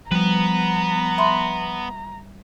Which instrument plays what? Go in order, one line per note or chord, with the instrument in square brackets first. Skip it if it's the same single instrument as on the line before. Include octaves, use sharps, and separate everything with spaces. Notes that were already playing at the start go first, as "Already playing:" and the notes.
[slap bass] F3 [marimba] G3 [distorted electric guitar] B3 B4 [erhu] A#5
[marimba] E5 B5 C6